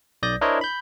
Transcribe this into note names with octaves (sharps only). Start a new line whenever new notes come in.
B1 D5 D#6 G6 A#6
D4 E4 A#4 C5 C#5 D#5
B5 G6